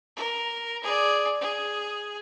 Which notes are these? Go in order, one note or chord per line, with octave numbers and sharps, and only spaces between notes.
A#4
G#4 D5
G#4